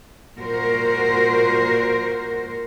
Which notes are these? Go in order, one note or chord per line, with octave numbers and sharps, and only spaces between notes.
A#2 F#4 A#4 C5